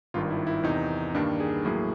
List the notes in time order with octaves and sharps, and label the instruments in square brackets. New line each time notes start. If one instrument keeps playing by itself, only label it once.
[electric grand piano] G#1 G2 D#3 F4
E4
E4
E2 C3 D#3 D#4
G2 D#3 G3 A#3 D4
G#4
A1 A2 F#3 A#3 G#4